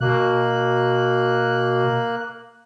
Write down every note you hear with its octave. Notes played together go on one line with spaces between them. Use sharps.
B2 A#3 F#6